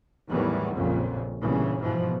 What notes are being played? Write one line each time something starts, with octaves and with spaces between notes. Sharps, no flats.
E2 A2 D#3 E3 F#3 G3
A#1 F2 A#2 C#3
G1 A#2 C#3 E3
G#2 B2 E3 F3